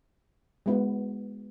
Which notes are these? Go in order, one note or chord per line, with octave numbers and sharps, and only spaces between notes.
G#3 B3 F#4